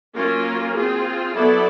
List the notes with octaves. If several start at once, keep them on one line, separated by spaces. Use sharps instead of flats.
F#3 A#3 C#4 F4 A#4
C4 F4 G#4
F#3 B3 E4 A4 D5